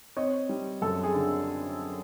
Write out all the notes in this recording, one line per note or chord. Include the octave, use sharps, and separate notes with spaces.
C4 C#5 D#5
G3
F#2 A4
G#4
D3